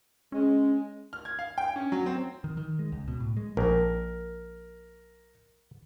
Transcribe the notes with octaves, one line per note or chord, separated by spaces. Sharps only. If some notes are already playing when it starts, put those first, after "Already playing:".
G#3 C#4
F6
G#6
F5
G5
C#4
F#3
C4
D#3
D#3
G#3
C#2
B2
A2
G#3
A#1 A#4